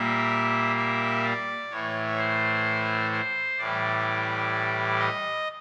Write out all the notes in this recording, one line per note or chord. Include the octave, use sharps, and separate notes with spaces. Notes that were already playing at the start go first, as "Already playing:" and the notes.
Already playing: A#2 G3 A#3 E5
E5
D5
A2 E3 A3 C#5
C5
C5
A2 E3 G3 D5
D#5